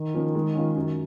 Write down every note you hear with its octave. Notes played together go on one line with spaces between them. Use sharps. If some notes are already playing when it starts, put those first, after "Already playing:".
Already playing: D#3
F3 A#3 C#4
G#3
C#4 F4
F#2